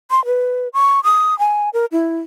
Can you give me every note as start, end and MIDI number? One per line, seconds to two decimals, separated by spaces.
0.11 0.24 84
0.25 0.68 71
0.73 1.00 85
1.04 1.37 87
1.39 1.69 80
1.73 1.86 70
1.92 2.18 64